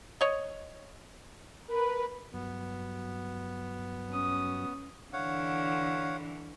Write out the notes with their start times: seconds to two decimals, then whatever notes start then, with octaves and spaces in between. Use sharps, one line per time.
0.21 C#5 D#5
1.68 A#4 B4
2.34 G2 F#3 B3
4.09 C#4 D#6
5.13 D3 E3 C#5 F5 F#5